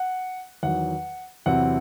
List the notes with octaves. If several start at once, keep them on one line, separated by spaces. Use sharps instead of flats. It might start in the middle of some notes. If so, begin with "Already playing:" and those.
Already playing: F#5
E2 D#3 F#3 F#5
E2 C3 F#3 C4 E4 F#5